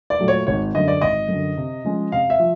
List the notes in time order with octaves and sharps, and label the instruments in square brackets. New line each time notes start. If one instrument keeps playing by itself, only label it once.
[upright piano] D5
[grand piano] A#2 F#3 A3
[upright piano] C#5
[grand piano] G#1 [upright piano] C#5
[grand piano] F#2 D3 [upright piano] D#5
[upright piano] D5
[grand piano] G#1 [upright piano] D#5
[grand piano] F#2 D3
C3
F3 G#3 C#4
[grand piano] C3 [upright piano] F5
[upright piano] E5
[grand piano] F3